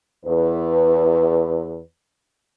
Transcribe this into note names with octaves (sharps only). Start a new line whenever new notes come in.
E2 B4